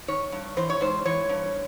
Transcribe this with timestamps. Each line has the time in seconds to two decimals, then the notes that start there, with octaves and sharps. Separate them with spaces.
0.08 D#3 C#5
0.32 G2
0.56 E3 C5
0.70 C#5
0.81 G#2 C5
1.05 E3 C#5
1.29 G2